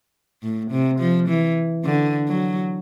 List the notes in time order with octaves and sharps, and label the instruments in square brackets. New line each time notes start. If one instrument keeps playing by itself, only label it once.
[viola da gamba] A2
C3
F3
E3
D3
F#3